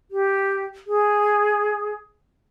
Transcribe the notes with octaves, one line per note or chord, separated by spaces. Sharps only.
G4
G#4